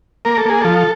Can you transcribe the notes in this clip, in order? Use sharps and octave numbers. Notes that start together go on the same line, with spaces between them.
A#3 A#4
A4
A#3 G#4
F3 A4